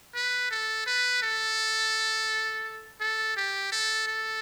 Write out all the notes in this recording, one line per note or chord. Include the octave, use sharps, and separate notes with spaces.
B4
A4
B4
A4
A4
G4
A4
A4